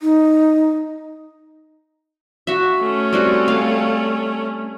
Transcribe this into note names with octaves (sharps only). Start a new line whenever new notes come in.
D#4
F#4 E5
A3 C#4
G3 C4 F#4
F5